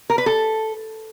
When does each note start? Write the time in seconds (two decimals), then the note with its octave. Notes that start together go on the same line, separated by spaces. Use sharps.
0.10 A#4
0.18 B4
0.26 A4